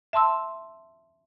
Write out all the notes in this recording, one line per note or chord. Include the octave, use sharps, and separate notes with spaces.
E5 A5 C6 E6